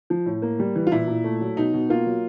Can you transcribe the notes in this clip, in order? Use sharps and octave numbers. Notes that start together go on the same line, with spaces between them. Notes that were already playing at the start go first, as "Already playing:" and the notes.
F3
A2
A#3
G3
E3
F4
A#2 E4
A#2
A3
F#3
B2 D#4
B2
A#3 F4
F#3